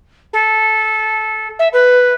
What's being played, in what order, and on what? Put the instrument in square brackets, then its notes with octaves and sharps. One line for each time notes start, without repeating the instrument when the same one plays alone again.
[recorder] A4
E5
B4